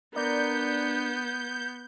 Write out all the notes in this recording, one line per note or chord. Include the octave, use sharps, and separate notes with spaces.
B3 D4 A#4 D5 A#5 G6